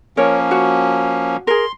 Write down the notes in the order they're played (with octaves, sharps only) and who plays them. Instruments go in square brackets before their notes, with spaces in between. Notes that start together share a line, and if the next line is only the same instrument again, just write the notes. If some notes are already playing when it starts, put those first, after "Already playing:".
[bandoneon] F3 A#3 C#4 [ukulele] A#4 C#5
[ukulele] F#4
[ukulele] G#4 A#4 [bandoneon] C6